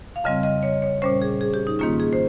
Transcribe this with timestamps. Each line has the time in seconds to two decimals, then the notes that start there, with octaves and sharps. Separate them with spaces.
0.16 F5
0.24 F2 C#3 G3 C4 D#5
0.43 D#5
0.63 C#5
0.82 C#5
1.02 A#2 G3 C#4 C5
1.22 G#4
1.41 G#4
1.54 G4
1.67 D#4
1.79 G#2 D#3 A#3 C#4 F4
2.00 G#4
2.13 C5